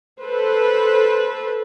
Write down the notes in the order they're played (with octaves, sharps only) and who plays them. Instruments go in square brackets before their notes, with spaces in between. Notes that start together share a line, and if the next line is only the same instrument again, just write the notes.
[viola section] A4 B4 C5